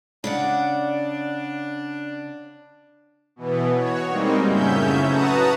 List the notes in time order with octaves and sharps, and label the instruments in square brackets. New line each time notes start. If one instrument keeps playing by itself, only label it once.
[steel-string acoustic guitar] C#3 D5 F#5 [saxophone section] D4
[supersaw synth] B2 E3 B3
F#4 C#5
G3 G#3 A#3 C4 D#4
F#2 A2 C#3 C#4 E5 G6
F#4 B4 F#5 A5 A#5 D#6